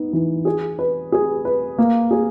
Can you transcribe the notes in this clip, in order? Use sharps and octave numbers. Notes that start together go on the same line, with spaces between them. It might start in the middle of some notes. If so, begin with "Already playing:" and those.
Already playing: B3 D#4
E3
G#4
B4
G#4
B4
A#3
G#4